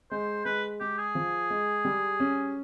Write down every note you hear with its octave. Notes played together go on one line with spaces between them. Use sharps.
G#3 C5
G#3 B4
G#3 G4
G#4
F3
G#3
G3
C#4